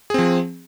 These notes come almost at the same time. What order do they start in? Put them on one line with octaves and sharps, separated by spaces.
G#4 C4 F3